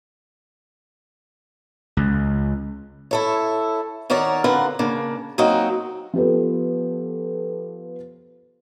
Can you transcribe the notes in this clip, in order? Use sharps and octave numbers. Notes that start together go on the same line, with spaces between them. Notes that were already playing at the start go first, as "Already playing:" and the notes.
C#2
E4 A4 C#5
D#3 F#4 A#4 C#5 D5
D3 C4 F4 A#4 B4 F#5
C#3 A#3 D4
F#3 A#3 C4 D#4 F#4
F3 B3 G4 A4 B4